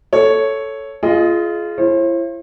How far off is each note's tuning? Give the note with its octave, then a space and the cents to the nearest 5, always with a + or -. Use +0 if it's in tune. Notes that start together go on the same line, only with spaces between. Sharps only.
A4 +0 C#5 +0
F4 -20 G#4 +25 D#5 +0
E4 +35 C5 +45